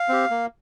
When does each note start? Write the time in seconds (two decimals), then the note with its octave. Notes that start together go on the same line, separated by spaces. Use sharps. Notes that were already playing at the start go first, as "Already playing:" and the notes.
Already playing: F5
0.09 C4 G4
0.30 A#3